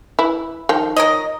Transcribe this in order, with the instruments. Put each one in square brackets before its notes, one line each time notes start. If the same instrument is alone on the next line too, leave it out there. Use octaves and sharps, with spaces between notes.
[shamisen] E4 B4
D#3 F3 G5
[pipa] A#4 C#5 D#5